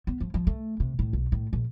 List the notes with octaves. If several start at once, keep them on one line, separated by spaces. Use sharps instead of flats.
B3
F3
F3
A3
C3
A2
B1
A2
A#1